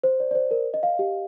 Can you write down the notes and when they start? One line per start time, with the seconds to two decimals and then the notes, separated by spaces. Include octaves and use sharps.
0.04 C5
0.20 D5
0.31 D5
0.35 C5
0.51 A#4
0.74 D#5
0.83 F5
0.99 G4